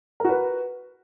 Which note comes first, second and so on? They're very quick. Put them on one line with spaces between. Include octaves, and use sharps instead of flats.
A#4 F#4 B4